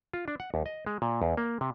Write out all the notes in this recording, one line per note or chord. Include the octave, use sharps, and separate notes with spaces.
F4
D4
F#5
D#2
D#5
G#3
A#2
E2
A#3
C3